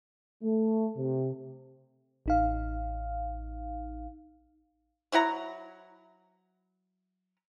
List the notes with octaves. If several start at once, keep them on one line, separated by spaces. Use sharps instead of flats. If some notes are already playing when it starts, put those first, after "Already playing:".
A3
C3
A1 D#4 F5
F#3 E4 F#5 A#5